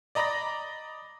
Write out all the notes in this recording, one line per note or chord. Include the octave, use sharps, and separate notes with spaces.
D5 D#5 A#5 B5 D6 A#6